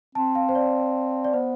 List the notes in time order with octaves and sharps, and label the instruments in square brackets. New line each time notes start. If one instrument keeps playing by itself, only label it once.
[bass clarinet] C4 [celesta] A5
[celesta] F5
C5
D5
D5
[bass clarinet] B3 [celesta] C5